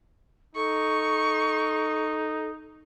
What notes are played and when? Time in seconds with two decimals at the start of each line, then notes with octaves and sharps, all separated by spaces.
0.56 D#4 A4 C#6